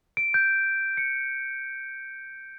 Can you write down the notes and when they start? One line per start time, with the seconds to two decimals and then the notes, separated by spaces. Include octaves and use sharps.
0.17 D7
0.34 G6
0.97 C#7